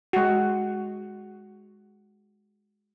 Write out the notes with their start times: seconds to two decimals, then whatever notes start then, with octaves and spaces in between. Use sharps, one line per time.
0.13 G#3 F#4